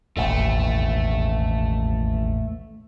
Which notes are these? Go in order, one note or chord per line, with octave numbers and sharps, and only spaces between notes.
E1 A1 D#2 A3